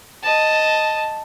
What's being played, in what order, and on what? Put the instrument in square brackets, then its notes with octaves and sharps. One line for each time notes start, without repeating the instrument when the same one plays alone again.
[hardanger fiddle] D#5 A5